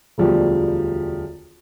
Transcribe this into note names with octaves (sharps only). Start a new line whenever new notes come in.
E1 D2 F3 G3